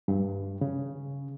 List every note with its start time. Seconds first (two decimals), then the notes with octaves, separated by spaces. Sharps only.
0.08 G2
0.61 C#3